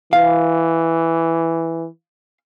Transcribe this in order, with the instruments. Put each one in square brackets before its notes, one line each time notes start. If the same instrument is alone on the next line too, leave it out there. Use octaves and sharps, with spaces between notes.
[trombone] E3 [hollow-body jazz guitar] F5